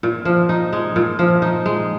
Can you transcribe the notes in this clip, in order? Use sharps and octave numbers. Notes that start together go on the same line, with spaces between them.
A#2
F3
D#4
G#3
A#2
F3
D#4
G#3